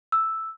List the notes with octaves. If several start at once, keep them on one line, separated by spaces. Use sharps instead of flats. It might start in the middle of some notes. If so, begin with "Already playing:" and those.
E6